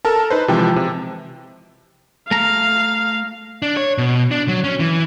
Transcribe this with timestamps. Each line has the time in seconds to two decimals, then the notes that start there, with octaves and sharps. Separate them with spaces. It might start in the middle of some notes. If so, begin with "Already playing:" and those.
0.05 A4 A#4 A5
0.30 D#4 B4 C5
0.48 C3 E3 F3 G#3 G5 A5
0.76 C3
2.31 A3 F5 A#5
3.62 D4
3.77 C#5
3.98 B2
4.31 D4
4.48 F#3
4.64 C#4
4.80 E3